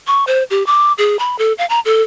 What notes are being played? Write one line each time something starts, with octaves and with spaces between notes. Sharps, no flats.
C#6
C5
G4
D6
G#4
B5
A4
F5
A#5
A4